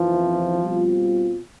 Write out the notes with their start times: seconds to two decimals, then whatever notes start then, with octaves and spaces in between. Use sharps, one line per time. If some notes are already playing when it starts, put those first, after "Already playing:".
Already playing: F#1 F2 C3 E3 F3
0.62 B2 G3 C4 F4